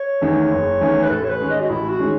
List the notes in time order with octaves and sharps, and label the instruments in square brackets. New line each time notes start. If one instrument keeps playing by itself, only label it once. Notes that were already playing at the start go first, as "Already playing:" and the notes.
Already playing: [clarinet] C#5
[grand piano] E2 D#3 A3 C#4
F#1
E2 D#3 A3 C#4
[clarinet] B4
[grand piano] A1 [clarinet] A4
[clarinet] C#5
B4
[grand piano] G#2 D#3 G#3 C#4
[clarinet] D#5
F#4
[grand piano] A1 [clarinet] E4
[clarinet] F#4
[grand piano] D#3 G#3 C#4